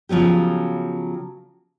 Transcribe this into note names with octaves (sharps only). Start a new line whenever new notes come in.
C#3 F3 F#3 B3 G4